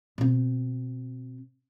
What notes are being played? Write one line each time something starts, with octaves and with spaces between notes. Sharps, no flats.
B2 C4